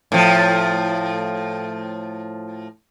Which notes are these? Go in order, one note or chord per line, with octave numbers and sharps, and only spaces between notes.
A2 F3